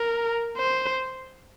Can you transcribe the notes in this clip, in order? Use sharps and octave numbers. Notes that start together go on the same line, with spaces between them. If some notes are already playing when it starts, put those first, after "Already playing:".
Already playing: A#4
C5